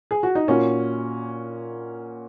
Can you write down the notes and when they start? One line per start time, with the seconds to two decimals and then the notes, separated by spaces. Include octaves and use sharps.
0.11 G#4
0.23 F#4
0.35 D#4
0.48 A#2 A#3 C#4 F#4